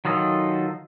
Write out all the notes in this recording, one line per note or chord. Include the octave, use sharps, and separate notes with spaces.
D#3 F#3 F4 A4 D#5